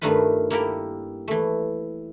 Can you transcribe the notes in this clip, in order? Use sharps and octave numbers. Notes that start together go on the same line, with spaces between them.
G2 D#3 A3 D#4 F4 B4
A#3 E4 G4 A4 A#4
E3 A3